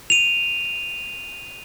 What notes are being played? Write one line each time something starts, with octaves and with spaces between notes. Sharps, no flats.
D#7 F7